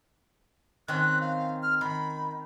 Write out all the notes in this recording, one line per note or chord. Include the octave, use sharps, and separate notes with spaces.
D#3 C4 C#4 F#6
F5
F6
D#3 B5